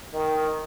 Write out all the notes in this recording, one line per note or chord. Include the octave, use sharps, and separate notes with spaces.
D#3